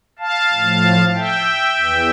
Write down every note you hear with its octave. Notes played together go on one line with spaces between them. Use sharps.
F5 A5
A2 F3
E5 G5
E2 E3